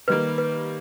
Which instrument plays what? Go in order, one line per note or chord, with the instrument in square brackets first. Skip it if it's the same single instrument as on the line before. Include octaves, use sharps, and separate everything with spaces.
[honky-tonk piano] D#3 G3 A#3 [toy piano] B4
[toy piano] B4